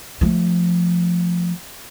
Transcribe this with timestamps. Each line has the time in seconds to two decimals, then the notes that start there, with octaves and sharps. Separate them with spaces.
0.21 F3 A3